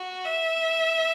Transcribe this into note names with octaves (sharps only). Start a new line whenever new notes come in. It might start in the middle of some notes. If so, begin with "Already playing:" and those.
Already playing: F#4
E5